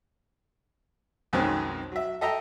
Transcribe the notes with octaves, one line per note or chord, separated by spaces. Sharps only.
B1 F2 D#3 G#3 C4 C#4
F#3 E5
A4 D#5 E5 G5 A#5